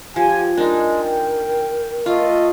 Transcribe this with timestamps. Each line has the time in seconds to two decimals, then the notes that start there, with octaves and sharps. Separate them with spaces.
0.16 F3 G4 G#5
0.57 G#3 D4 D#4 A#4
1.02 G5
2.06 A3 F4 D#5